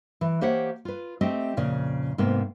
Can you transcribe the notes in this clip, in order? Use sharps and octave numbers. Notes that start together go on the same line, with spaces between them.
E3
A#3 G4 C5 C#5 E5 F#5
F4 B4
A3 C4 G4 D#5 E5
F2 A#2 C#3
G#2 C3 A#3 B3